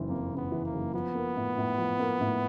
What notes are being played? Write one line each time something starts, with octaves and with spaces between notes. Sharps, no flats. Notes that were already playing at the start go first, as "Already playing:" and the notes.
Already playing: F#1 C#3 E3
F2 A#3
C#3
B3
E3
A#3
F#1
F3 B3
A#3
A2
A2
F3
A#3
A2